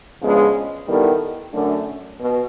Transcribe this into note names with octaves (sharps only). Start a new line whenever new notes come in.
C#3 F3 G#3 B3 D4
D#3 G3 B3 E4 A4
F#2 D3 F#3 A3 D4
B2